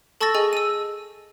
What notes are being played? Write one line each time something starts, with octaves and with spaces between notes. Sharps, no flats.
A4 A5 C#6 E6 A6 A#6
G#4 D#5 G#5
E6 D#7